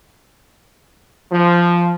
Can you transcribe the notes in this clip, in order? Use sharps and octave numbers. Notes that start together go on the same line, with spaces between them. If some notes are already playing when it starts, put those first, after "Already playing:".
F3